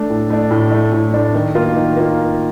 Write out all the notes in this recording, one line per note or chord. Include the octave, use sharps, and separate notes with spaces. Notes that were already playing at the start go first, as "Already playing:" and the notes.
Already playing: A3 D4
A2
A3 D4
A2
A3 D4
A2
A3 D4
D#3
A#3 F4
D#3
A#3 F4